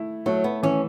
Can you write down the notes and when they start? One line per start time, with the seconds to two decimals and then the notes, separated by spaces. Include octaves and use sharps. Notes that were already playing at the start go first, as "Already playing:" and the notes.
Already playing: A3 E4
0.26 F#3 A3
0.44 B3
0.63 E3 C#4